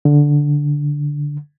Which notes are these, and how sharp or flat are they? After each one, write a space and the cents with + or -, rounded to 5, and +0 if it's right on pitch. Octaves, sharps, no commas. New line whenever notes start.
D3 -5